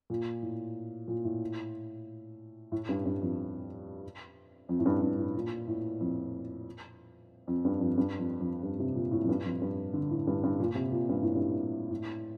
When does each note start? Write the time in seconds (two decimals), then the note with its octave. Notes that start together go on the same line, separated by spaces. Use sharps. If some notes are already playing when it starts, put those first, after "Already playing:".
0.10 A#2
0.42 A2
1.08 A#2
1.25 A2
2.72 A2
2.89 G2
3.05 G2
3.21 F2
4.69 F2
4.80 A2
4.86 G2
5.02 G2
5.18 A2
5.35 A#2
5.68 A2
6.00 F2
7.48 F2
7.65 G2
7.81 F2
7.98 G2
8.18 F2
8.40 F2
8.63 G2
8.79 C3
8.95 A#2
9.11 A2
9.24 F2
9.29 G2
9.45 F2
9.62 G2
9.93 D3
10.11 A2
10.27 G2
10.43 G2
10.60 A#2
10.75 C3
10.92 A#2
11.09 G2
11.23 A2
11.35 G2
11.91 A2